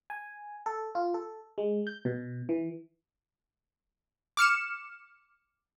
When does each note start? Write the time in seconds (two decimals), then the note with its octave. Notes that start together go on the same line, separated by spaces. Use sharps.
0.10 G#5
0.66 A4
0.95 F4
1.14 A4
1.58 G#3
1.87 G6
2.05 B2
2.49 E3
4.37 D6 F6 C#7 E7